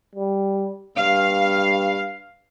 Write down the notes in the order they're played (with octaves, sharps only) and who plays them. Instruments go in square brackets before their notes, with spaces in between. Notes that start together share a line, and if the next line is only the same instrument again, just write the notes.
[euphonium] G3
[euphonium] G2 [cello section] F5